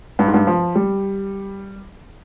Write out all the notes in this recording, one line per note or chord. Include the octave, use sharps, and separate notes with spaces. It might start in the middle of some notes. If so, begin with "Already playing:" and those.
G2
G#2
G2
F3
G3